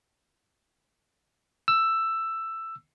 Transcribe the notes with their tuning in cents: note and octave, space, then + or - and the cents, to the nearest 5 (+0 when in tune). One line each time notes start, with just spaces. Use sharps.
E6 +10